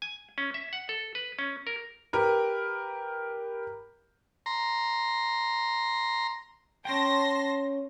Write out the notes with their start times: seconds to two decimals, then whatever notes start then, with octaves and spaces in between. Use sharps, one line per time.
0.02 G#5
0.38 C#4
0.54 E5
0.73 F#5
0.89 A4
1.15 B4
1.39 C#4
1.67 A#4
2.13 G4 A#4 B4
4.46 A#5 C6
6.85 C#4 G5 A5 C6 A#6